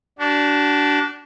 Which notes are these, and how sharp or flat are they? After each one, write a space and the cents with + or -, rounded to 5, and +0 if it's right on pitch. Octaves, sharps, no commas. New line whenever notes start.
D4 -10 F#4 +40